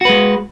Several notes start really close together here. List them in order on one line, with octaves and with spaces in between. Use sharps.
F#4 B4 G#3